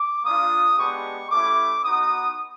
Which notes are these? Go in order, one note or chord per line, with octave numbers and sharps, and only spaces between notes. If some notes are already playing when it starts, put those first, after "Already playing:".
Already playing: D6
A#3 D4 F4 D#6
G#3 B3 D4 G4 C#6
A3 C#4 E4 G4 D6
B3 D#4 F#4 D#6